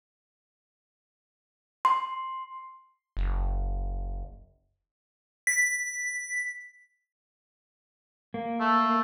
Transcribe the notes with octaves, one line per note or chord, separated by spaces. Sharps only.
C6
F#1
B6
A#3
A3